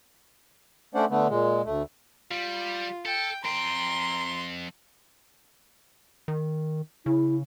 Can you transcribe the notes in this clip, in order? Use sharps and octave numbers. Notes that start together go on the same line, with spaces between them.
A3 C#4 D4 C5 D5 F#5
D3 A3 B3
A#2 G#3
D2 A3
G3 F4
A4 G5
F2 G5 A#5 C6
D#3
C#3 E4